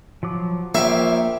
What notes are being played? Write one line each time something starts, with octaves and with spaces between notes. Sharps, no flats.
F3 F#3 D6
A#1 A#3 C#5 E5 F5 G5